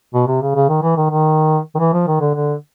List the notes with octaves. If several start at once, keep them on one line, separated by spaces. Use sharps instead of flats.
B2
C3
C#3
C#3
D#3
E3
D#3
D#3
D#3
E3
F3
D#3
D3
D3